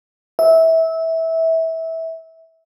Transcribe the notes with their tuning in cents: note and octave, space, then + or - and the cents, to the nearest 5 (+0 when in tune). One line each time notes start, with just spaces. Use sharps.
E5 -20